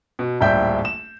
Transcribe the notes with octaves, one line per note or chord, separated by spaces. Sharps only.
B2
D1 A#1 G3 E5 G5 G6
E7